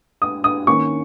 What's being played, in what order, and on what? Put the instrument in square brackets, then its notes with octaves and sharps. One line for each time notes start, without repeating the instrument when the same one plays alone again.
[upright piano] D#6
D#6
D#3 A#3 C#4 C#6